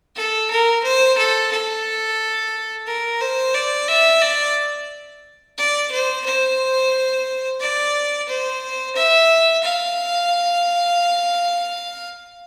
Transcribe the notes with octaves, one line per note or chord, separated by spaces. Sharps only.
A4
A#4
C5
A4
A4
A#4
C5
D5
E5
D5
D5
C5
C5
D5
C5
E5
F5